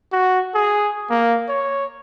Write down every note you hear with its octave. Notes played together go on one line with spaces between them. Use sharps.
F#4
G#4
A#3
C#5